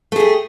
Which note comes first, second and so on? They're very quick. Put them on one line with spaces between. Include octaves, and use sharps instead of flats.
A3 G#4 G4